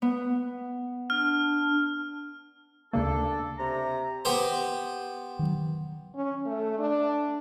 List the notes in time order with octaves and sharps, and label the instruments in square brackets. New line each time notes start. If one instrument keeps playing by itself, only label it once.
[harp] B3
[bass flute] D4 [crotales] F6
[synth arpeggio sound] D2 C#3 A#3 [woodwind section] D4 A4
[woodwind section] C3 A#5
[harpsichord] B3 G4 C5
[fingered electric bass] D#3 F#3
[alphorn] C#4
A3
D4